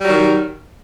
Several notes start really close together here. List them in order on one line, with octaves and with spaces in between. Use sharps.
G3 F#3 D#3